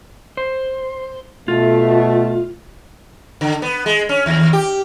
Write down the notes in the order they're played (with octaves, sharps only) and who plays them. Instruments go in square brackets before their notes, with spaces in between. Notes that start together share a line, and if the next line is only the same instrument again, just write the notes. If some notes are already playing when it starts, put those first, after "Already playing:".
[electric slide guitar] C5
[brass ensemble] B2 A3 [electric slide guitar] F4
[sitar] D3
B3
G#3
C#4
D#2
G4